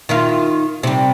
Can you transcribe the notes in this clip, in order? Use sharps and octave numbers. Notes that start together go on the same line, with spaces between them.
D#3 E4 F4
C3 G3